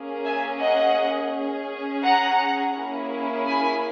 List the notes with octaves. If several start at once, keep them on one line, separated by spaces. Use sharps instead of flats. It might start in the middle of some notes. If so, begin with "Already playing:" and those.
Already playing: A#3 C#4 G#4
E5 G#5
D#5 F#5
C#4 G#4
F#5 A#5
A#3 C#4 E4 G#4
G#5 B5